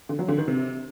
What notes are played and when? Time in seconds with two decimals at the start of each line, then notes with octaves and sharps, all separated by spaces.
0.09 D3
0.19 F#3
0.28 D3
0.38 D#3
0.48 C3